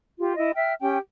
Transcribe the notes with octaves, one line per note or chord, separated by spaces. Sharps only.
F4 G4
E4 D#5
E5 G5 F6
C#4 G4 G5